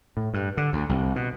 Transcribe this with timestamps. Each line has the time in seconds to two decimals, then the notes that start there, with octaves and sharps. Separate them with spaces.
0.17 A2
0.34 G2
0.57 D3
0.73 D2
0.89 C2
1.16 B2